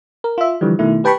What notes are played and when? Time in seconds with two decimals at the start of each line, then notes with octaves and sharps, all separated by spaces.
0.24 A#4
0.38 F4 E5
0.61 D3 E3 F3 G3
0.79 B2 D#3 A3 E4
1.04 G4 B4 G5 A5 B5 C#6